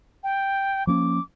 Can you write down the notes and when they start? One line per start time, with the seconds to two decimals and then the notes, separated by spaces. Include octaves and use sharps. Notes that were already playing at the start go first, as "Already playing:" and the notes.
0.24 G5
0.87 F3 A#3 C#4 D6